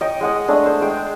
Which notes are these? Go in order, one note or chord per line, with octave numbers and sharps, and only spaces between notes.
D#5 G5 C#6
G#3 F#5 D#6
G#3 A3 D4
C5
G#3 G5